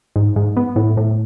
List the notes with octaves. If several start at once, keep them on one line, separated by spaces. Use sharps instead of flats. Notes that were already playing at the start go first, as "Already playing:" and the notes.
G#2
G#2
B3
A2
A2